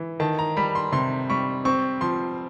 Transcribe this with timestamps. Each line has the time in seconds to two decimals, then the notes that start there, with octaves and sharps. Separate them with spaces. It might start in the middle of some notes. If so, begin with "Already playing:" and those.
Already playing: E3
0.20 D#3 A5
0.39 A#5
0.57 G3 B5
0.75 C6
0.92 C3 C6
1.29 G3 C#6
1.65 C4 C#6
2.01 F3 C6